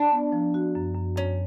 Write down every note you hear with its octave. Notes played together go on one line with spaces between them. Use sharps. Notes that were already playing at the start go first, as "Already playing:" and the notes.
Already playing: D4
B3
F3
F#4
F#2
F#2
F#2 C#4